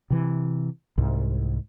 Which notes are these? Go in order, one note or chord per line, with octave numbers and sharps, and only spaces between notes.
C3 E3
C2 G#2